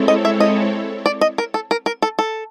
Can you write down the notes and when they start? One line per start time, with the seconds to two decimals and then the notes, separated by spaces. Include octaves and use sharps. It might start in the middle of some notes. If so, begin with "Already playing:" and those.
Already playing: G#3 C4 E4 A4 C#5
0.08 D#5
0.25 E5
0.40 D#5
1.06 D5
1.21 D#5
1.38 A#4
1.54 A4
1.71 A#4
1.86 A#4
2.02 A4
2.19 A4